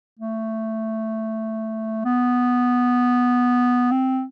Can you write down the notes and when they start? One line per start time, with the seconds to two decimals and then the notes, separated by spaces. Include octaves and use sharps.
0.19 A3
2.05 B3
3.91 C4